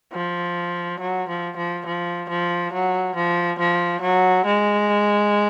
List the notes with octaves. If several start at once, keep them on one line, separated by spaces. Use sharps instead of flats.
F3
F#3
F3
F3
F3
F3
F#3
F3
F3
F#3
G#3